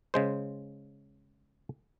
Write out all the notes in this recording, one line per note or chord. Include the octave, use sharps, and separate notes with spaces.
C#3 G#3 C5